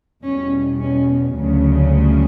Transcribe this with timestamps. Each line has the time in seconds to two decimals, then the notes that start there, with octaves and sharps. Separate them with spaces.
0.24 E2 B2 G3 C#4
0.80 C#4
1.35 D2 C#3 F#3
1.91 G3